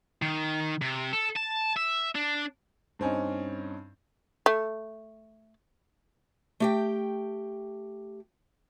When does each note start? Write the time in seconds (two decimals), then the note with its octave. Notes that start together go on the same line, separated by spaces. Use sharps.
0.22 D#3
0.82 C3
1.13 A4
1.36 A5
1.76 E5
2.15 D4
2.99 G2 C4 C#4 D#4
4.46 A3
6.60 A3 G4 G5